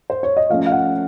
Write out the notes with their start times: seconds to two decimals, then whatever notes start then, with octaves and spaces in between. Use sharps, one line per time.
0.10 C5
0.23 C#5
0.37 D#5
0.50 F3 A3 C#4 F5
0.66 F5
0.72 F#5